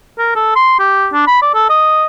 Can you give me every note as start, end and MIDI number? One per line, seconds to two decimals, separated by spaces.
0.19 0.31 70
0.36 0.53 69
0.56 0.76 84
0.80 1.07 67
1.13 1.24 62
1.27 1.40 83
1.42 1.53 74
1.54 1.65 69
1.70 2.06 75